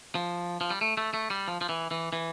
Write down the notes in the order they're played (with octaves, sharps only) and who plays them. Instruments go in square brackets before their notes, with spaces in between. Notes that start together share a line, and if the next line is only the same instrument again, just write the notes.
[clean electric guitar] F3
F3
G3
A3
A3
A3
G3
F3
F3
E3
E3
E3